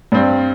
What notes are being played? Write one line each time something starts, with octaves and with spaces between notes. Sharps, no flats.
G2 G3 C4